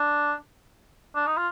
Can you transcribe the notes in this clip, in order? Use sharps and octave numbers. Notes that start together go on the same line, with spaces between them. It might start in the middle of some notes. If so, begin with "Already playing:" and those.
Already playing: D4
D4
D#4
F4